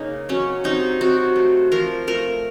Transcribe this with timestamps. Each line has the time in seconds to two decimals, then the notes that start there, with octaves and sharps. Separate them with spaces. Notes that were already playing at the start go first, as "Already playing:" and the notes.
Already playing: C#3 A#3 D#4
0.29 F#3 C#4
0.64 C3 D#4
1.01 C3 F#4
1.36 A3
1.72 F3 A#4
2.07 A3 A#4